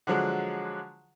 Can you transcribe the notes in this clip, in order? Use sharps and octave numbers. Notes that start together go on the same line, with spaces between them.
D3 F3 F#3 G#3